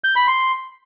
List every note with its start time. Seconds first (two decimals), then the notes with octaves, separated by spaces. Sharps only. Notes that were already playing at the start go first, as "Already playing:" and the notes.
0.04 G6
0.16 B5
0.27 C6